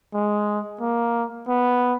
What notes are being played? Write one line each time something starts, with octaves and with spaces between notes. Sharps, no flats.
G#3
A#3
B3